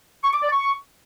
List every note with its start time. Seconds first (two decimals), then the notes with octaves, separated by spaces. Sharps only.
0.24 C#6
0.33 D6
0.42 D5
0.51 C#6